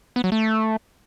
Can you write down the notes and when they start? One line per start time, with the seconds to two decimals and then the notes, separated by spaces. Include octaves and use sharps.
0.16 B3
0.24 F#3
0.32 A3